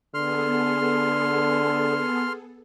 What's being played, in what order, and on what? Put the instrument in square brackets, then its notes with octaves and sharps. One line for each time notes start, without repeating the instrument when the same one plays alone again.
[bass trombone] D3 [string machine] B3 G#4 A4 [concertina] C6 F6